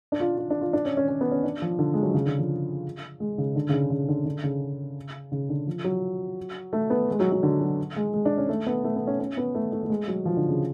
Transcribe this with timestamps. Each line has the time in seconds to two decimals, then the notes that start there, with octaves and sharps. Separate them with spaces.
0.12 D4
0.20 F4
0.38 F4
0.50 D4
0.61 F4
0.73 D4
0.85 C#4
0.97 C#4
1.08 C#4
1.21 B3
1.32 C#4
1.44 D4
1.62 F3
1.79 D3
1.94 G#3
2.03 F#3
2.14 C#3
2.26 D3
2.38 F3
3.20 G#3
3.38 C#3
3.56 D3
3.69 C#3
3.73 D3
3.90 C#3
4.08 D3
4.25 D3
4.44 C#3
5.32 C#3
5.49 D3
5.67 F3
5.84 F#3
6.73 A3
6.90 B3
7.11 G#3
7.20 F#3
7.32 F#3
7.43 D3
7.60 F#3
7.96 G#3
8.14 G#3
8.25 D4
8.38 C#4
8.49 A3
8.67 B3
8.84 A3
8.96 B3
9.07 C#4
9.20 C#4
9.37 B3
9.55 A3
9.72 A3
9.84 A3
9.90 G#3
10.08 F#3
10.25 F3
10.37 D3
10.48 C#3